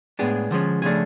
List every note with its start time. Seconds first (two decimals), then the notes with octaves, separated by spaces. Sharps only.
0.19 A2 G#3 B3 D4 G#4
0.51 D3 F3 G#3 C#4
0.82 C#3 F3 A3 D4 G#4